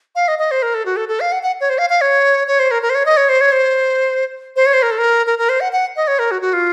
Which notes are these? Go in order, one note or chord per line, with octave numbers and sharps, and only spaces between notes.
F5
D#5
D#5
C5
A#4
A4
F#4
A4
A4
F5
F#5
F#5
C#5
C5
F5
F5
C#5
C#5
C5
A#4
A#4
C5
C#5
D#5
C#5
C5
C#5
C5
C5
C#5
C5
A#4
A4
A#4
A#4
A#4
C5
F#5
F#5
D#5
C#5
A#4
F#4
F#4
F4